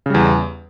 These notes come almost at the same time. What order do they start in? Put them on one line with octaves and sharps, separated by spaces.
C#3 G3 E2